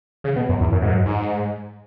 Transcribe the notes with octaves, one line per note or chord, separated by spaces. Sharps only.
C#3
B2
F#2
E2
F#2
G#2
F#2
G#2